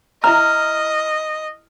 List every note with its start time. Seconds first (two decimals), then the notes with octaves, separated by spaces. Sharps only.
0.24 E4 D#5 E5 A#5 F6